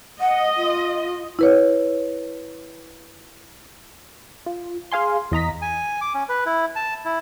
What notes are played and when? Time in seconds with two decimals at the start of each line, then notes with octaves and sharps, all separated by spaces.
0.21 D#5 F#5
0.57 F4
1.39 E4 B4 C#5
4.46 F4
4.92 G#4 F5 G#5 C6
5.32 E2 D#5 A#5 B6
5.62 G#5
6.01 D6
6.14 C#4
6.29 B4
6.46 E4
6.76 A5
7.05 E4